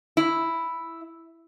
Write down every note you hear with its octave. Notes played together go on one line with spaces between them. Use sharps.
E4